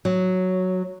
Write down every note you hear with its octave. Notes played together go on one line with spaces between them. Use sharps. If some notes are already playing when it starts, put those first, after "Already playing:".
F#3